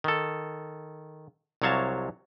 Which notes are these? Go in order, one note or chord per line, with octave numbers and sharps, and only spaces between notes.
D#3 A4
C2 C3 F#3 C#5 F5 A5